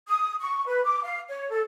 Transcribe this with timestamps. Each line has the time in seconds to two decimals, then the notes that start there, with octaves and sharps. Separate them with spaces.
0.07 D#6
0.41 C#6
0.66 B4
0.84 D6
1.03 F5
1.29 C#5
1.50 A4